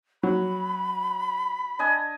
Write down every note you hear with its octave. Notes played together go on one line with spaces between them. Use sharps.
F#3 B5
D4 D#5 G#5